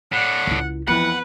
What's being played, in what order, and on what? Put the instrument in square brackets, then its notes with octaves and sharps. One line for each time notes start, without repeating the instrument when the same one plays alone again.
[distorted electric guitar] A2 D4 [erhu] F#5
[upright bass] C#2 E4
[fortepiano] F2 E3 [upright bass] B3 [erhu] B4 [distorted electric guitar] F#5